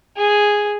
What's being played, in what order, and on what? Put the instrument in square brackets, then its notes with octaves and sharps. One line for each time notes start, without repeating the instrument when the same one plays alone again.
[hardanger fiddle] G#4